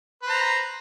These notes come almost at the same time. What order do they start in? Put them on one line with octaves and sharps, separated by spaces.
B4 C5 A#5